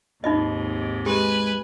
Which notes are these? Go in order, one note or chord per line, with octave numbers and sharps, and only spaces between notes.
D#2 G#2 C3 D#4 F4 D#5
G#3 G4 B4 G#5